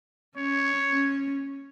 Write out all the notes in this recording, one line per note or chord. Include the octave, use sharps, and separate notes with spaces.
C#4 C#5
C#4